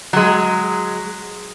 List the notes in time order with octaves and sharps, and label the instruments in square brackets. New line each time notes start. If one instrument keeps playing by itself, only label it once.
[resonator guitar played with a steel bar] F#3 G#3